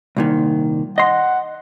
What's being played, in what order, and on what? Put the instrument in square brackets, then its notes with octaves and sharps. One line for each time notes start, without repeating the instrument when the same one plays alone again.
[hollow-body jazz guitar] C2 A#2 D#3
[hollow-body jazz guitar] D#5 C6 [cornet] F#5